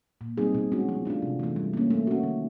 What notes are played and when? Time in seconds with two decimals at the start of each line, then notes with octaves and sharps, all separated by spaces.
0.21 A#2
0.38 G3 C4 D#4 G#4
0.54 B2
0.72 G#3 C#4 F#4
0.89 F3
1.05 A3 D4 F4
1.22 C3
1.39 E3 A3
1.56 G3
1.74 A#3 C#4
1.90 A3
2.07 C#4 F#4
2.23 D#3